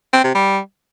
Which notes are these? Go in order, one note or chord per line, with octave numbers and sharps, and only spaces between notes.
C4
C3
G3